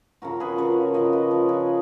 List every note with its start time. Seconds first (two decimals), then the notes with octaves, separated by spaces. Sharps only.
0.22 C#3 F3 F#4 A#4
0.40 G#4 B4
0.58 C#3 F3 A#4 C#5
0.94 C#3 F3 B4 D#5
1.13 B4 D#5
1.30 C#3 F3 A#4 C#5
1.49 G#4 B4